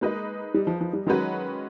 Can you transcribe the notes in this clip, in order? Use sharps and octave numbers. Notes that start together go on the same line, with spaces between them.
G#3 A#3 D#4 G#4 B4 D#5
G3
F3
F3
G3
D#3 F#3 G#3 C#4 F#4 B4